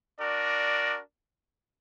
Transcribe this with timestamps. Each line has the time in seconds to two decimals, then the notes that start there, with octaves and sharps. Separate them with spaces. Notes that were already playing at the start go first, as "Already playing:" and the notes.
0.19 D4 F#4 A#4 D5